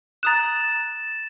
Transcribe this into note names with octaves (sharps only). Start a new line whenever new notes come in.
A#5 D#6 F#6 A6 E7